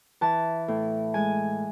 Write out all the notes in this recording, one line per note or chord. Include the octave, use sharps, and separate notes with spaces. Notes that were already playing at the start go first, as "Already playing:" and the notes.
E3 A5
A2
G#3 G#5